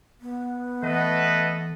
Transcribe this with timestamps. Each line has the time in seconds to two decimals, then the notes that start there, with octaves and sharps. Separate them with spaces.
0.21 B3
0.83 E3 A3 A4 B4 D#5